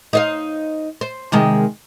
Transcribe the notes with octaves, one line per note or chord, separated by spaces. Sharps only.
D#4 C5 F5
C5
C3 D#3 G#3